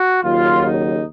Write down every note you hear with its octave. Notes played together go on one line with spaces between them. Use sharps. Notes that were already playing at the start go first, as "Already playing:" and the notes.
Already playing: F#4
D#2 C#3 F#3 F4
D#4